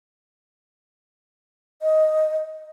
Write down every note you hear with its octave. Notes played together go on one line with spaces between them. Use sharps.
D#5